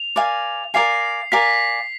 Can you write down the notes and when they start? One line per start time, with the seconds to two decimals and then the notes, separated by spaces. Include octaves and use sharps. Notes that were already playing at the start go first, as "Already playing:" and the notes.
Already playing: F7
0.16 A#4 D5 F5 G#5
0.74 A#4 D5 F5 G#5 C7
1.32 A#4 D5 F5 G#5 B6